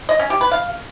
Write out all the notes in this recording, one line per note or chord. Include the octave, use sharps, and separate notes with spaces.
D#5
C#4
G4
B4
F5